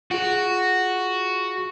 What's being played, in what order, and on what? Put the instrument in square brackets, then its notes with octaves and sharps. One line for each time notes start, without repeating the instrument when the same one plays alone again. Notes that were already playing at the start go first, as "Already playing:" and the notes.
[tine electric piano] F4 G#4 [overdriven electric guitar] F#4